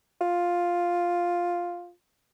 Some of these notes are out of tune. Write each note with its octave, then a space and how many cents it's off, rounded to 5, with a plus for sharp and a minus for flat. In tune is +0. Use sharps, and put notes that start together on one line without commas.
F4 +5